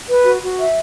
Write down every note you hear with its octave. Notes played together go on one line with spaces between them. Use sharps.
B4
F#4
F#4
E5